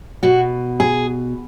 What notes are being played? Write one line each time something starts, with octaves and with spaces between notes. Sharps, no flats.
B2 F#4
G#4